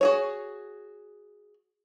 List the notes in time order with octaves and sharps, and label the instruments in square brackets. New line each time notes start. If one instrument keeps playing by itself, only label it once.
[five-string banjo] F#4 G#4 C#5